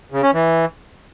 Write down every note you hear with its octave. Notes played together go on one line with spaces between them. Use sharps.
C#3
C#4
E3